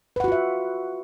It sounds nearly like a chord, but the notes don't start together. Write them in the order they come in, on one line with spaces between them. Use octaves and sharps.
B4 F#5 F#4 F4 E5